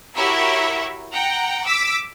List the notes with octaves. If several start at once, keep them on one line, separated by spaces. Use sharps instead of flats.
E4 F#4 G4 A#4 C#5 E5
F#5 G5 A#5
D6 E6 B6